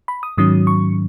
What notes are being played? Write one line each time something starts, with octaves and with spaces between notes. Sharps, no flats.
B5
D#6
G#2 D#3 F#3 C#4 D#6
C#6